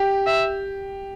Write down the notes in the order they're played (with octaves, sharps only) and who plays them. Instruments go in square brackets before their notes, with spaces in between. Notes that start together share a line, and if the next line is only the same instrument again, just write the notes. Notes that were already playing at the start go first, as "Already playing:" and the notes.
Already playing: [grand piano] G4
[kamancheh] E5